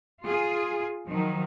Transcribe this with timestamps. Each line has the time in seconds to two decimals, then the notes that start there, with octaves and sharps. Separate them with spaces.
0.24 F4 G#4
1.08 D#3 F3 F#3